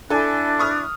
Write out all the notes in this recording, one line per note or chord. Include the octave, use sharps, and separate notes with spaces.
D4 E4 A4 G#5 F#6
C#6 D#6 F6